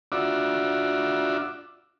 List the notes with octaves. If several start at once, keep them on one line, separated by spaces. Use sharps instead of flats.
D4 F4 F#4 D5 E5